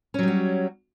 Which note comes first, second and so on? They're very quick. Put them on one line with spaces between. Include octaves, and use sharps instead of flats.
C#4 F#3 G3 F#4